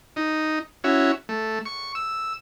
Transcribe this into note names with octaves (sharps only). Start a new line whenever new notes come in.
D#4
C#4 E4 F#4
A3
C#6
E6